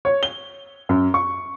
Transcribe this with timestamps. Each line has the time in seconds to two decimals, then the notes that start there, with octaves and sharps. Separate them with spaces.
0.05 C#5
0.23 G7
0.89 F#2
1.14 C#6